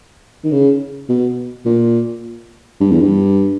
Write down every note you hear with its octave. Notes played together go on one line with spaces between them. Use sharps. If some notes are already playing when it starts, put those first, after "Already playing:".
D#3
C#3
B2
A#2
G2
E2
G2